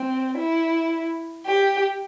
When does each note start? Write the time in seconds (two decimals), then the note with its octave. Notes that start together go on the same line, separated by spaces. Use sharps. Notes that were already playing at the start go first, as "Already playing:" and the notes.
Already playing: C4
0.37 E4
1.46 G4